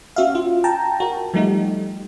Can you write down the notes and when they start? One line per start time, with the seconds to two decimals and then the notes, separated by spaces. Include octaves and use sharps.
0.16 C#4 F#4 E5 F5
0.35 F4
0.64 G5 A5 A#5
1.00 F#4 A#4
1.34 F3 G3 A3 D#4 G4